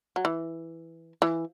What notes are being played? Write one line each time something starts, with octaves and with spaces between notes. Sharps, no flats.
F#3
E3
E3